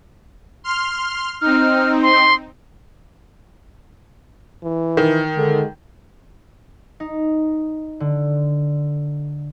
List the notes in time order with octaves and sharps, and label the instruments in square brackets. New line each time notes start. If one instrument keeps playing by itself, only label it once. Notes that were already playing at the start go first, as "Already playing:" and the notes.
[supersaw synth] C6 F6
[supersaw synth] C4 D#4 [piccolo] F6
[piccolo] C6
[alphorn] E3
[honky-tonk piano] D#3
[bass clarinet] D3 [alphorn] G#3
[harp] D#4
D3